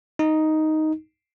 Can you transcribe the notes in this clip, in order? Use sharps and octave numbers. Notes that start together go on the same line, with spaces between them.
D#4